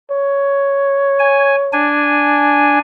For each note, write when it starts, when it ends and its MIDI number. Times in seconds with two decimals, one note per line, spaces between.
0.11 1.86 73
1.19 1.55 80
1.73 2.79 62
1.73 2.79 80